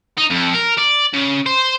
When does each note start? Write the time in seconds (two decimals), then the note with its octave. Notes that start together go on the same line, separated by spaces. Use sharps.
0.18 D#4
0.30 F2
0.53 A#4
0.78 D5
1.13 C#3
1.46 C5